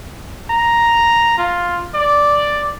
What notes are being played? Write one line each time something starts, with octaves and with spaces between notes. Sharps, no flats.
A#5
F4
D5